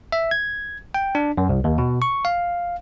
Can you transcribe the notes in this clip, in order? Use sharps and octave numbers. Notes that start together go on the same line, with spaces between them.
E5
G#6
G5
D4
F#2
C2
D#2
B2
C#6
F5